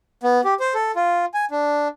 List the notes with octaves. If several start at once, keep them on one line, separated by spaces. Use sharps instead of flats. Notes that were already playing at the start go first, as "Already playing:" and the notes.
B3
G4
C5
A4
F4
G#5
D4